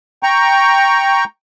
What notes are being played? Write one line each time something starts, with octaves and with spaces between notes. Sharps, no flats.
G5 A#5 C#6